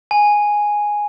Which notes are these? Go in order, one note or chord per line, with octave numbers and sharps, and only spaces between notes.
G#5